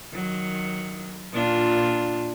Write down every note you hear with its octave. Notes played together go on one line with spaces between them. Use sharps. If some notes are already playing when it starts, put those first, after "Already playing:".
D#3 F#3
A#2 D4 F4